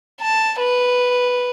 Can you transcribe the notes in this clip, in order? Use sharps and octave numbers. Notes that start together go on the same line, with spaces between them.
A5
B4